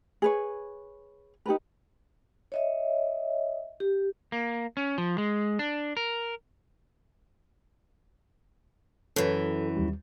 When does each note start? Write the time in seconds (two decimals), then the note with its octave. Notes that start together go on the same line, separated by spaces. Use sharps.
0.22 G#4 B4 C#5
1.46 D#4 G4 A#4 B4
2.52 C#5 D#5 E5
3.80 G4
4.32 A#3
4.77 C#4
4.98 F3
5.18 G#3
5.59 D4
5.97 A#4
9.16 F#2 E3 A4
9.77 D#2 G3